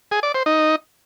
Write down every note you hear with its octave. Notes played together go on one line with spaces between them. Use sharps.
G#4
D5
C5
D#4